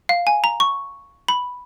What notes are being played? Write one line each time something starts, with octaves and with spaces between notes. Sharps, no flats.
F5
G#5
A#5
C#6
B5